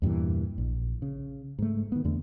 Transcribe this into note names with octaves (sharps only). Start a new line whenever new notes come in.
E2 G2 A#2 E3
A#1
C#3
G#2 A3
D#3 B3
E2 D3 A3